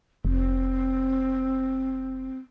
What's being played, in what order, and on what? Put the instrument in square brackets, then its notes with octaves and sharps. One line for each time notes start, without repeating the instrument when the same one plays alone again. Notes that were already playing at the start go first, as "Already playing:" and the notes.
[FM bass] F1 [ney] C4